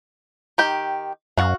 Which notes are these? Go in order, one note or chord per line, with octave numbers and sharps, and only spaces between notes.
D#3 G4 G5
F#2 F#4 F5